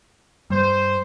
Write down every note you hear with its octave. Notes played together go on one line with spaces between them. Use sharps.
G2 G3 C5